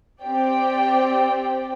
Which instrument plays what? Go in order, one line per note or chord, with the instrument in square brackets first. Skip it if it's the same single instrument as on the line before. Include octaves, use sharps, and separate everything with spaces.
[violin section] C4 G4 D5 G5